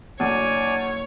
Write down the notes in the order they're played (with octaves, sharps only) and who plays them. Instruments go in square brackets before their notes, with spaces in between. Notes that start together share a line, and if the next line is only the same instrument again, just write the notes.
[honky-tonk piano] F#1 [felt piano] D2 [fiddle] C#5 [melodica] D5 G#5